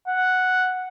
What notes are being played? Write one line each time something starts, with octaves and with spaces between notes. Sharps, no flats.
F#5